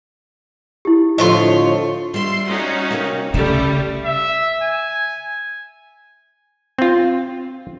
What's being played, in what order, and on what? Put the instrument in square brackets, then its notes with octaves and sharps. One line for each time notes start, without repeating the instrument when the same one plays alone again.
[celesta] E4 G4
[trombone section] A2 D3 F3 [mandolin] A3 C#5 C6 [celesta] D#5
[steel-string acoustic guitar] G3 E5 [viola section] C6
[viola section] C#4 D#4 F#4
[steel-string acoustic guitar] C3 A#3
[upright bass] C#3 [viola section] G3 A3 G4 [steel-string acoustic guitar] D5 E5
[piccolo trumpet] E5
G#5
[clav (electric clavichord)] C4 F4